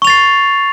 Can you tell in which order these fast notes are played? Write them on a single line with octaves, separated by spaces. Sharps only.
C#6 F7 A6 C7